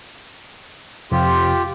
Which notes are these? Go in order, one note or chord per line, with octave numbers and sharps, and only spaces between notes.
F2 C3 F4 G4